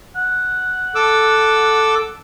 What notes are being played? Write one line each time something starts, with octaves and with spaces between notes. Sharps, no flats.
F#5
A4 D6 E6